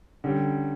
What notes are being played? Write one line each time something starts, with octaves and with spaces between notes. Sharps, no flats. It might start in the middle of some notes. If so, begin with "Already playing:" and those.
D3 G3 C#4 G4